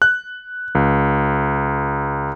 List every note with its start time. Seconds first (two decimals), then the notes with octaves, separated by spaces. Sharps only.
0.02 F#6
0.75 C#2